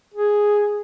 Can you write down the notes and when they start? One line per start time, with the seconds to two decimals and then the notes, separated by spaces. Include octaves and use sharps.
0.14 G#4